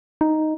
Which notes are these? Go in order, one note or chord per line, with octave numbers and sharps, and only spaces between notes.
D#4